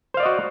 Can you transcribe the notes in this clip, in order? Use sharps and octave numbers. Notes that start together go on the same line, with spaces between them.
F#4 C5 D5 D#5 F5